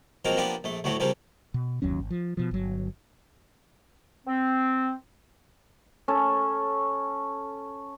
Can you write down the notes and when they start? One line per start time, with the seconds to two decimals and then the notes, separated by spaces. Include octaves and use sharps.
0.25 F3 F#3 G#3 A#3 C4 A#4
0.37 F3 A#3 B3 D4 G4 B4
0.64 A#1 A3
0.84 D2 A2 F#3 A3 F#4
1.00 C#3 F3 G3 A#3 C4
1.54 B2
1.82 G1 D#2 F#3 C#4
1.99 G#1
2.10 F3
2.37 B2 F3
2.51 G1 F#3
4.27 C4
6.08 C#4 A4 C#5